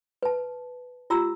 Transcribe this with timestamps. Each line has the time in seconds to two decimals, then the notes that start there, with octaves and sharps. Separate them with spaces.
0.23 B4 A5
1.10 F4 G4 A#5 E6